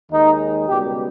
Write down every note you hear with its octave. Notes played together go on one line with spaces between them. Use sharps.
D#2 D#3 G#3 D#4
C#2 B2 G3 G4